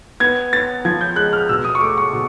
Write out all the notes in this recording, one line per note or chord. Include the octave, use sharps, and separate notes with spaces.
B3 G#6
B3 A6
F3 G#6
G6
G#3 F#6
F6
B2 E6
D#6
C#6
A3 D6
C#6
B2